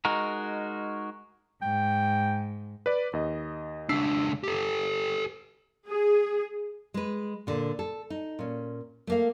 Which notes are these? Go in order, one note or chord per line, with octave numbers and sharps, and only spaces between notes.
G#3 D#4 F#4 A#4
G#2 G5
B4 D5
D#2 D#5
C#2 D4 E6 B6 C7
G4 A4
G#4
G#3 B4
A#2 D3
A4
D#4
A#2 C#4
A3 A#3 F5